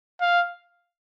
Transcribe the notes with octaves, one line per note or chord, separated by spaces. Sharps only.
F5